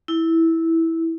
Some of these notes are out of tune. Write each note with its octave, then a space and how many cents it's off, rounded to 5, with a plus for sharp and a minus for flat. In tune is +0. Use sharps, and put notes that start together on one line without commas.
E4 -10